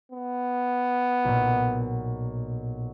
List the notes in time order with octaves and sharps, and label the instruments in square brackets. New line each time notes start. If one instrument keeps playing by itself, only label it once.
[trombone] B3
[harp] B1 A#2